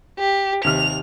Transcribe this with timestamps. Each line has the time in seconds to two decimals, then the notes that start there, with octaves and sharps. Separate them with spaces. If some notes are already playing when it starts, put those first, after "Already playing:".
0.19 G4
0.64 D#2 C3 F6 F7